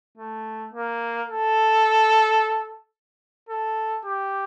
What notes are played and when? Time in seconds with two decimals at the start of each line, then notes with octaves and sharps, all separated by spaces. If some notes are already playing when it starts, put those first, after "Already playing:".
0.17 A3
0.73 A#3
1.28 A4
3.49 A4
4.04 G4